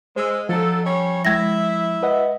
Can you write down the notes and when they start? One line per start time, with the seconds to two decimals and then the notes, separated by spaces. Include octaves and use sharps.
0.16 G#3 C5 E6
0.49 F3 F#3 D#4 A4
0.85 G3 C#4 C#5
1.25 G#3 E4 E5 A#6
2.03 B4 D#5 F#5